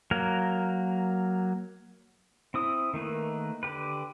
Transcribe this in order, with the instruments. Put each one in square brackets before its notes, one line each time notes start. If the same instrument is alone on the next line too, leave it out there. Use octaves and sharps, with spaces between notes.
[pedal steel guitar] F#3 A#3 A#4
C4 E4 D#6
D#3 A3 A#3 B4
D3 G4 B4